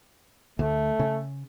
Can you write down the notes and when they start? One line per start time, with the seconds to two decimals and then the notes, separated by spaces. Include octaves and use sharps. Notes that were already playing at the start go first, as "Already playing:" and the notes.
0.59 D2 A3
1.00 C#3